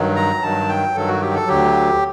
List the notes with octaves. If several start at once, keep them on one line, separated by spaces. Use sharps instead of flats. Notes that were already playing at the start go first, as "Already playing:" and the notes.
Already playing: G2 D#3 F#3
A#5
G2 D#3 F#3 A5
G5
G2 D#3 F#3 A4
F#4
G4
A4
D2 D3 F#3 G4